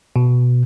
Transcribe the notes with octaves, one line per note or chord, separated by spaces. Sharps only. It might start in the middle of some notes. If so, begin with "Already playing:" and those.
B2